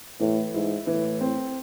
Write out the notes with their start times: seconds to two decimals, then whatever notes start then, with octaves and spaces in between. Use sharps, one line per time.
0.20 A2 E3
0.54 G#2 E4
0.87 A2 E3
1.21 C4